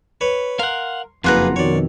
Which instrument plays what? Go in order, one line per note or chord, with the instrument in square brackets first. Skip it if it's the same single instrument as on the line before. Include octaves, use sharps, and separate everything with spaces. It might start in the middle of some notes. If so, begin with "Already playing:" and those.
[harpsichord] B4 C#5
[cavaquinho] A#4 [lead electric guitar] F5 F#5 [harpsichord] C6
[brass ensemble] F#1 [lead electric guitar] F2 [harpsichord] A#3 G#4 B4 [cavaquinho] F4 F#5 A#5
[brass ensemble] B2 D#3 [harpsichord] C#5 D5